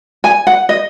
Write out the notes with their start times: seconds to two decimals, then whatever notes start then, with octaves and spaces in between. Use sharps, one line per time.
0.24 G#5
0.47 F#5
0.69 D#5